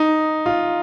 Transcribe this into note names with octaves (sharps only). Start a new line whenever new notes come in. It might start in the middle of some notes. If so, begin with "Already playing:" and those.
Already playing: D#4
F4